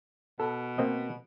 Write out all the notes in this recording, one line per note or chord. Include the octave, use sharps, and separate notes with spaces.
B2 A4
A#3 C4 D#5